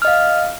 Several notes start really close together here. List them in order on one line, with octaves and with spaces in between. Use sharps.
F6 D#5 F5